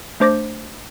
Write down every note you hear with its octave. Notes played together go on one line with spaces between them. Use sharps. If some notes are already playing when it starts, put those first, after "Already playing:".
A3 D4 C5 D6 A6 A#6